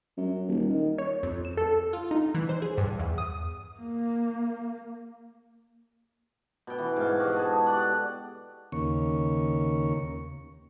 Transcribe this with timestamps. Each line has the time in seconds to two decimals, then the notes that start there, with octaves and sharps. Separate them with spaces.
0.18 F#2
0.47 D#1
0.70 D#3
0.98 C#5
1.23 F2
1.45 E7
1.57 A4
1.93 F4
2.11 D#4
2.35 E3
2.49 C5
2.62 G#4
2.78 G2
2.99 E2
3.18 D#6
3.81 A#3
6.67 B2 G5
6.79 E3
6.96 G#2 F5
7.20 F#4 G4 D#5
7.36 G#4 A4
7.67 G4 D5 F#5
8.72 D#2 C#3 A#3 C#6